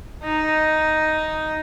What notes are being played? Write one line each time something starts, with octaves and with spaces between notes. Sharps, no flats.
D#4